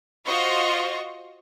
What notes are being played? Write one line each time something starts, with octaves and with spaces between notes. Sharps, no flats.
F4 F#4 C5 D#5 C#6